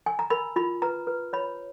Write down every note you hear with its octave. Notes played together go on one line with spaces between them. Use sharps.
G#5
A#5
A#4 B5
F4 B5
B4 A#5
B4
C#5 B5